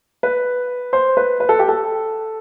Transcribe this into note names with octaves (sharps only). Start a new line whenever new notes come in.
B4
C5
B4
B4
A4
G4
A4